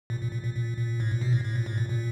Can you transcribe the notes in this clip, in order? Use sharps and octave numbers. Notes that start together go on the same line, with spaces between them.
A#2
A#2
A#2
A#2
A#2
A#2
A2
A#2
B2
A2
A2
A#2
A2
A#2
A#2